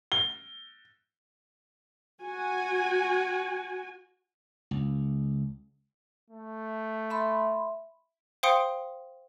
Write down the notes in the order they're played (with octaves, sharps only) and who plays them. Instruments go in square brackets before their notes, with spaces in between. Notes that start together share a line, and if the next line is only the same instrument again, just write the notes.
[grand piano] G7
[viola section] F#4 G#5
[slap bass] C#2
[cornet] A3
[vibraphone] E5 B5 C6
[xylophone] C5 F5 G5 C6 D#6 C#7